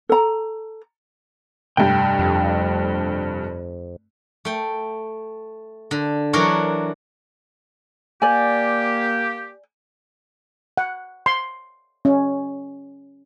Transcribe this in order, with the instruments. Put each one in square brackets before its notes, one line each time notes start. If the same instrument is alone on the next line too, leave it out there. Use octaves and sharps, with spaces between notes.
[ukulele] A4 A#5
[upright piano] F1 G2 [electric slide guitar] G5
[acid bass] F2
[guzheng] A3 G5
D3
E3 F#3 D4 F#4 A#4 C#5
[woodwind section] A#3 G4 [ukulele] D5 G#5
[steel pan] F#5
C6
C#4